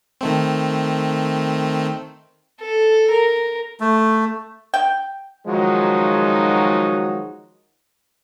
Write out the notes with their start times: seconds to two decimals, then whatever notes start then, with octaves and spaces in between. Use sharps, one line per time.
0.21 D#3 A3 C4
2.61 A4
3.12 A#4
3.80 A3
4.74 G5
5.47 D#3 F3 F#3 G#3 D#4 F#4